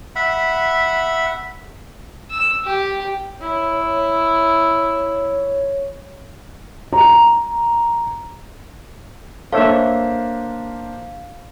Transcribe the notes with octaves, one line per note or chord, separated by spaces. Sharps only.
E5 F#5 B5
E6
G4
E4 C#5
A#5
A#3 D4 A4 C5 C#5 E5 F5